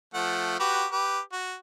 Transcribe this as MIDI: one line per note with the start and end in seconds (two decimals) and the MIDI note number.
0.14 0.59 53
0.14 0.59 57
0.14 0.59 78
0.60 0.86 66
0.60 0.86 67
0.60 0.86 71
0.92 1.19 67
0.92 1.19 71
1.33 1.54 66